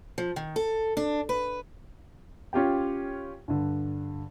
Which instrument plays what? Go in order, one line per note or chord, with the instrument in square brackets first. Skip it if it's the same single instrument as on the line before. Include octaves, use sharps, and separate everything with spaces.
[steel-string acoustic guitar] F3
D#3
A4
D4
B4
[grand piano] C#4 F4 G4 G5
G2 D3